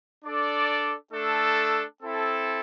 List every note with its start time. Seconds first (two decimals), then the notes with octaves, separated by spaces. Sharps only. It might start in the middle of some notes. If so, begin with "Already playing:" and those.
0.23 D4 A4 D5
1.12 A3 D4 A4
2.01 C4 E4 A4